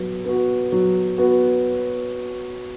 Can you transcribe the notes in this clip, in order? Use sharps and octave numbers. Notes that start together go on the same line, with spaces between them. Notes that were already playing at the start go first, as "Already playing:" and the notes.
Already playing: F#3 B3
B3 F#4
F#3
B3 F#4